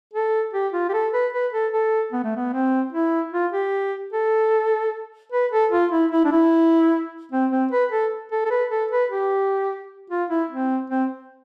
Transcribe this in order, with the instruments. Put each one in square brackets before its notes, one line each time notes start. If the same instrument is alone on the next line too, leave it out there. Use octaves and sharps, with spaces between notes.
[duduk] A4
G4
F4
G4
A4
B4
B4
A4
A4
B3
A3
B3
C4
E4
F4
G4
A4
B4
A4
F4
E4
E4
D4
E4
C4
C4
B4
A4
A4
A4
B4
A4
B4
G4
F4
E4
C4
C4